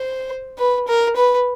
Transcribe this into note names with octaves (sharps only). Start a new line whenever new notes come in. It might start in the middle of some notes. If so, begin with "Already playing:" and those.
Already playing: C5
B4
A#4
B4